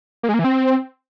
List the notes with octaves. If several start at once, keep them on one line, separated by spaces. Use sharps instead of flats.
A#3
G#3
A#3
E3
C4